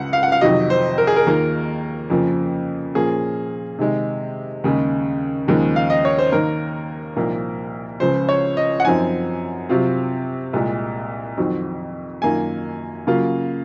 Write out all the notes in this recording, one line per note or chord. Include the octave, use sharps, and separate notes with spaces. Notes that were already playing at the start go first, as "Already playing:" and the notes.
Already playing: C#2 C#3 F#5
F5
F#5
F5
F2 C3 D#3 F#3 D#5
C5
A#4
G#4
A#4
D#2 D#3 A#3 F4
F2 C#3 F3 A#3
A#2 F3 A#3 C#4 G#4
C3 D#3 G#3
D#2 C#3 G#3
D#2 C#3 F3 G#3 D#4
F5
D#5
C#5
C5
D#2 D#3 A#3 D#4 A#4
C2 A#2 F3 A#3 D#4
C#2 C#3 F3 C5
C#5
D#5
F#5
F#2 F3 C4 D#4 G#5
C3 F#3 C4 F4
C2 A#2 G#3
F2 D#3 F#3 C4
F#2 D#3 A#3 F4 G#5
C#3 F#3 A#3 F4